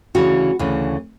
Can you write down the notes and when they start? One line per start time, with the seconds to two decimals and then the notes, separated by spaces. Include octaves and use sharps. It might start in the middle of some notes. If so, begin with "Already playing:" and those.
0.15 D2 C#3 E3 F#4
0.59 D2 C#3 E3